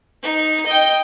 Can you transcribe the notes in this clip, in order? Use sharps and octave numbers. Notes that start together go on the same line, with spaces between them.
D#4
D#5 G5